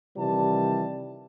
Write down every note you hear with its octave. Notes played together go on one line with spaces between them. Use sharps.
C3 D#3 E3 G3 A5